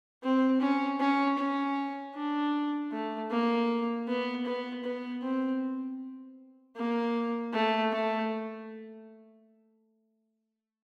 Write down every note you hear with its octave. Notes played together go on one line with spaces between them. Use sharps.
C4
C#4
C#4
C#4
D4
A3
A#3
B3
B3
B3
C4
A#3
A3
A3